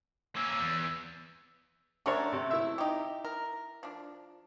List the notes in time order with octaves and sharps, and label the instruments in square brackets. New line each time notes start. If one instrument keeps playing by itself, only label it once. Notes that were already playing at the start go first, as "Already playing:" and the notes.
[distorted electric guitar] A#3 C#4 [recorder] E6
[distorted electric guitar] E2
[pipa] F#3 A3 C#4 [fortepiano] D4 A#4 C#5
[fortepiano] C3
E4 E5
[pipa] D#4 G4
A#4
F3 D4